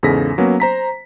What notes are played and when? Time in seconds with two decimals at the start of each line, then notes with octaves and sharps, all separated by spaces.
0.03 E2 G#2 C#3 A4 A#6 B6
0.38 F#3 A#3 B3 C#4
0.60 C5 A#5 B6